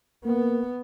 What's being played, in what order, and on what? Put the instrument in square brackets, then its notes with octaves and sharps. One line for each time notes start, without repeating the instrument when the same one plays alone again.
[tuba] A#3 [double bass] B3